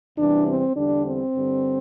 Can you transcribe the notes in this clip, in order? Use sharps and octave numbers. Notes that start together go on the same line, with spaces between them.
E2 C3 E3 G3 D4
C4
E2 D3 G3 D4
C4
G2 D3 G3